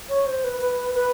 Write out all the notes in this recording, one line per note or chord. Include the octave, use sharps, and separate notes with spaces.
C#5
C5
B4
B4
B4